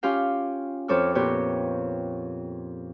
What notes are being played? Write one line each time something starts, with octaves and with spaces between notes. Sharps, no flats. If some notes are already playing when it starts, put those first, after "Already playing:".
C#4 F4 G4 F5
F2 C4 A4 C#5 D6 F6
A#2 B3 G4 C#5